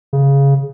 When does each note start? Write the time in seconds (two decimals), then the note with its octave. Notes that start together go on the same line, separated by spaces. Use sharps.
0.13 C#3